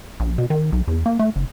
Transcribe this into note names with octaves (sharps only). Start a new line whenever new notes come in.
A#1
B2
D#3
B1
E2
A#3
A3
F#1